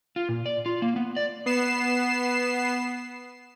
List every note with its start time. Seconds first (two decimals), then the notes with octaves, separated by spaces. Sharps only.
0.16 F4
0.29 A#2
0.46 D5
0.66 F4
0.82 A#3
0.96 B3
1.16 D5
1.46 B3 C7 E7